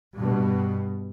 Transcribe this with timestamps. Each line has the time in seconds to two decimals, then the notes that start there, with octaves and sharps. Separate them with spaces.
0.18 G2 B2